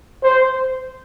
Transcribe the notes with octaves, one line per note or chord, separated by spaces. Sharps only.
C5